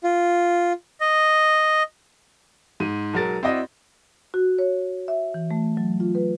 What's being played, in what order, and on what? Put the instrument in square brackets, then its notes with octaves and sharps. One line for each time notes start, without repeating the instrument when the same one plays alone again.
[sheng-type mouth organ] F4
D#5
[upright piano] G#2 D#7
B1 F#3 G#3 A#4 A6
C4 E4 F#4 D5 D#5
[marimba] F#4
C#5
E5
E3
A3
F#3
F4
B4